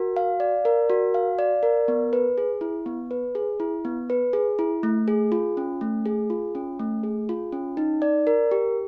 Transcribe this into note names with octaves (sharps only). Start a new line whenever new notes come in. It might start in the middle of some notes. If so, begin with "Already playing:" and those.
Already playing: F#4 A#4
F5
D5
A#4
F#4
F5
D5
A#4
B3
B4
G#4
E4
B3
B4
G#4
E4
B3
B4
G#4
E4
A3
G#4
F4
C#4
A3
G#4
F4
C#4
A3
G#4
F4
C#4
D#4
D5
A#4
G4